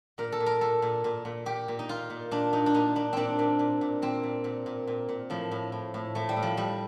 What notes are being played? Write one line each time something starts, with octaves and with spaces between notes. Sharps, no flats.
A#2 A#4
A4
A#2
A#4
A#2 A4
A#2
A#2
A#2
A#2 G4
A#2
D#4
A#2 F4
A#2
A#2 D4
A#2 D#4
D4
A#2 D#4
A#2 D4
A#2 C4 D4
A#2
A#2
A#2
A#2 C4
A#2
A#2
A#2
A#2
A#2
A2 F3
A2
A2
A2
A2 A3
G3
A2
F3
A2 G3